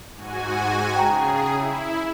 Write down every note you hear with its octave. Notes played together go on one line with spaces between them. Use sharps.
G#2 F#4 G#5
C#3 G#4 G5 A#5
E4